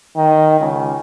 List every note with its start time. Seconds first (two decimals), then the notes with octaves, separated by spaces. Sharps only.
0.16 D#3
0.60 C#2